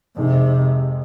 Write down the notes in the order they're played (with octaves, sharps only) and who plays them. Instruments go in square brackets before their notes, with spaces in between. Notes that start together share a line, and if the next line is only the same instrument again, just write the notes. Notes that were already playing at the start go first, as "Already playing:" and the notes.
[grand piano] F2 D#3 G#3 [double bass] C3